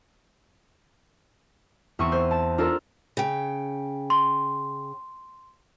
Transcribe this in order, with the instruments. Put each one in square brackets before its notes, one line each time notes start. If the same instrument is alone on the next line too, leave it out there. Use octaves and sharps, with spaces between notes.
[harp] E2 C4 C#6 D#7
C5
A5
D4 F4 A4 A#4
[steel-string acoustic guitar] C#3 G5
[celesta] C6